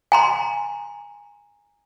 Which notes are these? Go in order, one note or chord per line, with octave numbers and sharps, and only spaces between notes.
G#5 A#5 C6